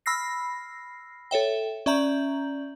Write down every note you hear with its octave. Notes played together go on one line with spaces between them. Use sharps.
B5 E6 F6 A#6 C7
A4 C#5 E5 G5
C#4 D5 E5 A#5 G6 F#7